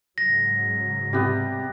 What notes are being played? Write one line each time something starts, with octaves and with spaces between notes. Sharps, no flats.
G#2 C#3 F#3 A#6
C3 G3 B3 G4